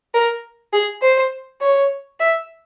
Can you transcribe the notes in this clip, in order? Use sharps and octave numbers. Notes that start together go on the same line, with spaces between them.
A#4
G#4
C5
C#5
E5